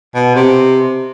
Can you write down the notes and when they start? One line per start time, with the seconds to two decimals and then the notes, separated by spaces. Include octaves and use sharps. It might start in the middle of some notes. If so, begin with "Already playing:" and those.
0.15 B2
0.36 C3